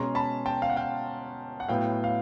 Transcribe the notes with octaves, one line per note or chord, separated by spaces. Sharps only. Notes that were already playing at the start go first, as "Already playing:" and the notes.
Already playing: B2 G#3 C#4 A#5 C6
A5 B5
G5 A5
F5
F#5
F5 G5
F#5
A2 F#3 B3 F5 G5
F5